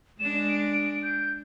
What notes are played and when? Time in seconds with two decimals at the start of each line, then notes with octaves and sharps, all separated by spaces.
0.20 G#3 D4 E7
0.49 D7
1.03 G6